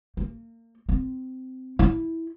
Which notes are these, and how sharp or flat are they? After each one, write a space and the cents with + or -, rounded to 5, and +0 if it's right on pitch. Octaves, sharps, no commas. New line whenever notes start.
A#3 -30
C4 -20
E4 -10